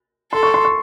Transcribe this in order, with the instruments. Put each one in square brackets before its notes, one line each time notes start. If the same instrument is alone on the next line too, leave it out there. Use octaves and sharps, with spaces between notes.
[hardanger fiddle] A4 [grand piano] C6
[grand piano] C#6
C6
C#6